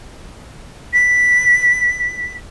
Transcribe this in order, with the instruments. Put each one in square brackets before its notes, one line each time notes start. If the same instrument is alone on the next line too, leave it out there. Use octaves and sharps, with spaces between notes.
[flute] B6